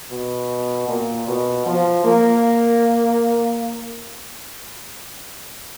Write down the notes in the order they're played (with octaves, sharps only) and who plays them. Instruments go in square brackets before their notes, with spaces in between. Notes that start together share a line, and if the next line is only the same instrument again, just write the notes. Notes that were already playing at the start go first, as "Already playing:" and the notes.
[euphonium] B2
A#2
B2
F3
A#3